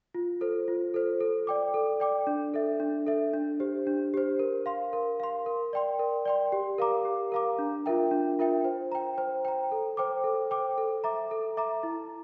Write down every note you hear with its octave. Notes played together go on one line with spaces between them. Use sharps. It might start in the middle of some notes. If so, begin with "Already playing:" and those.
F4
A4 C5
F4
A4 C5
A4
D5 G5 D6
A4
D5 G5 D6
D4
A4 E5
D4
A4 E5
D4
G4 C5
D4
G4 C5
A#4
F5 C6
A#4
F5 C6
A#4
D5 G5 C6
A#4
D5 G5 C6
G4
A#4 F5 A#5 D6
G4
A#4 F5 A#5 D6
D4
F4 A#4 E5 G5
D4
F4 A#4 E5 G5
C5
G5 A#5
C5
G5 A#5
A4
C5 G5 D6
A4
C5 G5 D6
A4
E5 A#5 D6
A4
E5 A#5 D6
E4